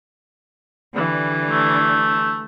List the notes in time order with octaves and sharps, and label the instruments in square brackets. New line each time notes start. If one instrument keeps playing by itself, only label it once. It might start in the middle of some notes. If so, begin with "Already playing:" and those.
[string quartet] D3 E3 G3
[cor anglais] A3